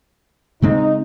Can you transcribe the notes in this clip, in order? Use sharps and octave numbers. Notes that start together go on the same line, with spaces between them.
C#3 G#3 C4 D#4